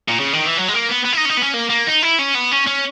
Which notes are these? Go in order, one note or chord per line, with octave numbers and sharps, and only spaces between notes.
A#2
C#3
D#3
E3
F#3
G#3
A#3
B3
B3
E4
D#4
C#4
D#4
B3
C#4
A#3
A#3
D#4
E4
C#4
B3
C#4
C#4